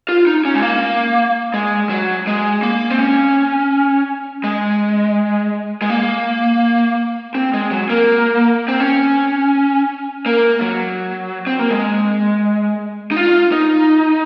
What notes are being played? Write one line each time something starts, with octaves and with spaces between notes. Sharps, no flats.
F4
D#4
C#4
G#3
A#3
G#3
F#3
G#3
A#3
C4
C#4
G#3
G#3
A#3
C4
G#3
F#3
A#3
C4
C#4
A#3
F#3
C4
A#3
G#3
D#4
F4
D#4